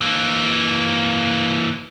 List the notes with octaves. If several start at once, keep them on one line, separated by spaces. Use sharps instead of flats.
E3 A#3